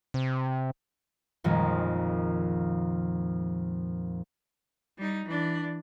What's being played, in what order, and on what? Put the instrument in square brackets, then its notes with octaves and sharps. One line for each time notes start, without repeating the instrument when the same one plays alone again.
[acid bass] C3
[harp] A#1 F2 D#3 G#3
[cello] G3 D#4
E3 D4